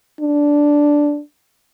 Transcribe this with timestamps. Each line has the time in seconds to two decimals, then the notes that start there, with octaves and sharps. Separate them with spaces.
0.20 D4